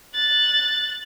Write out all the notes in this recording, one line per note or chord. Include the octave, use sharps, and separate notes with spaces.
F#6 A6